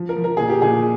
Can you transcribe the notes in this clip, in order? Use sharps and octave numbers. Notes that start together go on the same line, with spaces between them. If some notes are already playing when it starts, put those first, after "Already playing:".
Already playing: F3
A#4
F3
A#4
A#2 G#4
G4
A#2 G#4